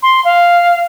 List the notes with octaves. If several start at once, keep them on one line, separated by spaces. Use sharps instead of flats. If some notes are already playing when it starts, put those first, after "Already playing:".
C6
F5